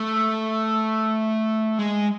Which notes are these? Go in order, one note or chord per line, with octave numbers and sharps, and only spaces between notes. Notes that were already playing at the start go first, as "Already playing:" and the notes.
Already playing: A3
G#3